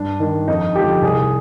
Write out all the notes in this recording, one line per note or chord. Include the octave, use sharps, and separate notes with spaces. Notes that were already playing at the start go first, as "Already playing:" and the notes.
Already playing: G2 D4
D#3
F2 D#4
D3 F3 G4
C2 G#4